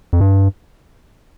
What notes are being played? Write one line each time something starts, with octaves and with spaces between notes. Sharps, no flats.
F2
G2